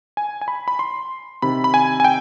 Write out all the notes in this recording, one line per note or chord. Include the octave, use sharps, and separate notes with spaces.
G#5
G#5
B5
B5
C6
C3 D#3 B5
B5
G#5
G#5
G5